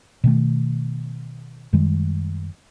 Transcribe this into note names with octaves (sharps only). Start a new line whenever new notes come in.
B2 D#3 A3
F#2 D#3 G3 G#3